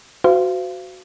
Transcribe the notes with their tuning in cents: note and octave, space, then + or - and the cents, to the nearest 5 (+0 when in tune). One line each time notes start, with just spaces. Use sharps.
F#4 +0 C5 -35 F5 -30